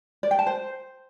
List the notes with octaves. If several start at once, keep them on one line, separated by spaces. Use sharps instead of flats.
D5
G5
A5
C5